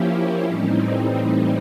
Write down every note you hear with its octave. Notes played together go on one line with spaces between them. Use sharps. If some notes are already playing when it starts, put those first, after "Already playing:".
Already playing: F3 A#3 C#4 E4 G4
A2 E3 G3 C4 D#4